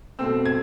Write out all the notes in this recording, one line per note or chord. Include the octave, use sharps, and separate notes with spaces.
B2 A3 C4 E6
G#6